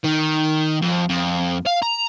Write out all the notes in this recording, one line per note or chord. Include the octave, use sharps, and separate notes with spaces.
D#3
F2
F2
F5
A#5